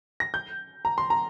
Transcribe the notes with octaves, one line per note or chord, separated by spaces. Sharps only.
A#6
G6
A#5
C6
A#5